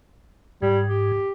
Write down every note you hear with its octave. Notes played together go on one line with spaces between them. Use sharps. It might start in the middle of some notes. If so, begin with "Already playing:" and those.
G#2 G3
G4